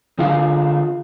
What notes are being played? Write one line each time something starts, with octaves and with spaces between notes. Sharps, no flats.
D3 F4 G#4 F5